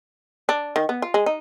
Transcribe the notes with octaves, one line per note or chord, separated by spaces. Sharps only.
D4
D#3
B3
F4
G#3
D#4